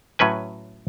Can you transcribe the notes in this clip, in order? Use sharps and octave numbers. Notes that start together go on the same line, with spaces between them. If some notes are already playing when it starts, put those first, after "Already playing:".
A2 F#3 C#4 B4 G#5